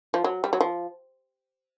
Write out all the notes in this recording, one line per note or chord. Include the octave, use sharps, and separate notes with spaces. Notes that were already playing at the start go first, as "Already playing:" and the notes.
F3
F#3
G3
F#3
F3